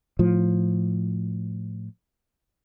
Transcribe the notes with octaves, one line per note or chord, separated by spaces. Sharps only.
A2 F3